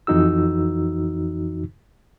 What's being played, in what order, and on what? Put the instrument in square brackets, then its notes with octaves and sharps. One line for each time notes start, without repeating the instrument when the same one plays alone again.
[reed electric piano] F2 E3 D#4 F#4 E6